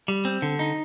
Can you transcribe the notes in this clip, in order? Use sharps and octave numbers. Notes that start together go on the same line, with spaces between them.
G3
C4
D3
D#4